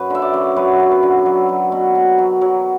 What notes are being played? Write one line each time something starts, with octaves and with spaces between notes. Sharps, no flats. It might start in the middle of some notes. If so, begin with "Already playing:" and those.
Already playing: F#2 B4
D3 E5
D5
F#2
F#3 B4
F#2
B4
D3
F#3
F#3
B2
B2
F#3
F#3